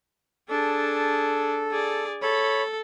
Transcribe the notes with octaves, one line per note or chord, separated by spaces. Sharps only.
D4 G#4 A4
G#4 D5
A4 C#5 B5